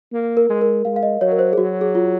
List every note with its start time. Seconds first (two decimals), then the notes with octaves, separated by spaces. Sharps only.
0.13 A#3
0.37 A#4
0.49 G#3
0.61 A#4
0.85 G#3 F5
0.96 F5
1.03 D#5
1.21 F#3 C#5
1.32 A#4
1.39 C5
1.53 G#4
1.57 F#3 F#4
1.81 G#4
1.95 F4